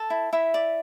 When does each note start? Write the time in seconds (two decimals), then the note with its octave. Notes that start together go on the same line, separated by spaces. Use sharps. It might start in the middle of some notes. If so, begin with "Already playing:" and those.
Already playing: A4 A5
0.10 E4
0.33 E4 E5
0.54 D5